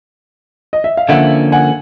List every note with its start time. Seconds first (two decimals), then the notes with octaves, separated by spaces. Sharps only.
0.73 D#5
0.84 E5
0.97 F5
1.09 D3 F3 A#3 C#4 E5 F#5
1.52 F#5 G#5